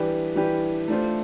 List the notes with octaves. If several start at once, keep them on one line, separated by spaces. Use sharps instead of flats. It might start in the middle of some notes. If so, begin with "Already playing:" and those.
Already playing: E3 G3 D4 G4 B4
E3 G3 D4 G4 B4
A3 D4 F4 C5